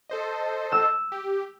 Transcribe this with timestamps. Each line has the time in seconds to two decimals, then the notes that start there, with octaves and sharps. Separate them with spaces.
0.10 A4 C5 D#5
0.72 E6
1.12 G4